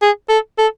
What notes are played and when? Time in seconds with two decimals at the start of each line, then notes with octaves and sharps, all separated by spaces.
0.02 G#4
0.29 A4
0.58 A4